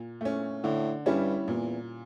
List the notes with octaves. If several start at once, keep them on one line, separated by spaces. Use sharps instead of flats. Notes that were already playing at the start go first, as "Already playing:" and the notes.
Already playing: A#2
A3 C#4
A2 D3
G2 G3 C#4 E4
E2 A#2